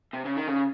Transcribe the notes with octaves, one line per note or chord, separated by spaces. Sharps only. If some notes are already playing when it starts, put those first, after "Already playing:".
C3
C#3
D#3
C#3